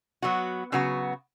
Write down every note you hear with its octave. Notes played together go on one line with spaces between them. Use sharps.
F#3 B3 F#4
C#3 F#3 B3 F#4